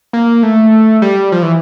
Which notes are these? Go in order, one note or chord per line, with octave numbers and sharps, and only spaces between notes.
A#3
A3
G3
F3
E3